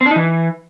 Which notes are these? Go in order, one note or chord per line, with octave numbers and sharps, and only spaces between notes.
C4
D4
D#4
E3